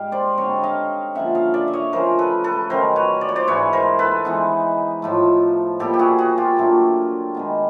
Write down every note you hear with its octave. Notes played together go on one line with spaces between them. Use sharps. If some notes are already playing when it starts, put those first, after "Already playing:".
Already playing: G#2 G3 F5 G5
C5 D5
D3 G3 C4 D#4 C#5 D#5
D#5 F5
D3 F3 A#3 C#4 E5 F#5
D#5 F5
D5 E5
E5
C#5 D#5
C#3 F3 A3 C#4 A#4 C5
A4 B4
A4 B4
D#3 F#3 A3 C#4 A#4 C5
B4 C#5
D5
C#5
C5 D5
G#2 E3 G#3 B4 C#5
A#4 C5
A4 B4
E3 G#3 B3 D#4
A2 F3 A3
A#2 G3 B3 G4 A4
G4
F#4 G#4
F#4 G#4
F4 G4
A#2 F#3 A3 D4
D#3 G#3 B3